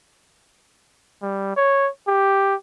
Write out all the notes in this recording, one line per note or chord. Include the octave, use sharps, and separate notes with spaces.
G3
C#5
G4